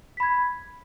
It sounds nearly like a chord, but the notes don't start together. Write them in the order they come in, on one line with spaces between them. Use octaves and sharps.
B6 B5 G#6